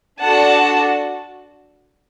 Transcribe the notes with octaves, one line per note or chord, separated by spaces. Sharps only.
D4 F#4 A4 F#5 A5